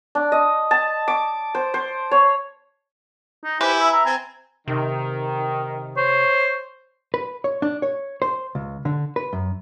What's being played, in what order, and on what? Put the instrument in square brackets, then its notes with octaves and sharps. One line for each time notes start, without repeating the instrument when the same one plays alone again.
[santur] D4
D#5
A5
D6
C5
C5
C#5
[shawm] D#4
[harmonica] E4 G#5 [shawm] G4 [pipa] B4 [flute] C5
[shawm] E5 [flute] B5
[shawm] E5 [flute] A#5
[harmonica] C4 [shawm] G#5
[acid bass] C3 [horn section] D#3
[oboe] C5 [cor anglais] C#5
[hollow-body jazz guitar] B4
C#5
D4
C#5
C5
C#2
D3
B4
F#2